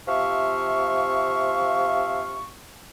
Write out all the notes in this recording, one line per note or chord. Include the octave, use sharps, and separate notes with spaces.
C3 F3 E5 F5 C#6